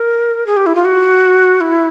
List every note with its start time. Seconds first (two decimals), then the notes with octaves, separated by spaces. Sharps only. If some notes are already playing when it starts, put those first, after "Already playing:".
Already playing: A#4
0.47 G#4
0.57 G4
0.66 E4
0.75 F4
0.85 F#4
1.61 E4